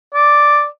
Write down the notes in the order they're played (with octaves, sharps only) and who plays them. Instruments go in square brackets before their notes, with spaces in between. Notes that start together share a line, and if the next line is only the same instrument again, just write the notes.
[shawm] D5